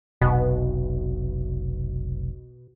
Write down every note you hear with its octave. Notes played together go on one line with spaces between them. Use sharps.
F1 B1 B2